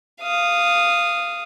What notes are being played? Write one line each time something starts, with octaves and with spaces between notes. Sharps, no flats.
F5 D#6